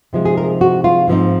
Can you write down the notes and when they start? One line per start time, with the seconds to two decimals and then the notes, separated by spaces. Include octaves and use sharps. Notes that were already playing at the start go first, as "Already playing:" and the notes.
0.13 C3 F3 G#3 D#4
0.25 G#4
0.38 A#4
0.61 F#4
0.84 F4
1.08 G#2 F3 C4 D#4